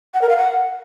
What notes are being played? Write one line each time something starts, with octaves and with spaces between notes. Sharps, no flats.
F#5
A#4
F5
F#5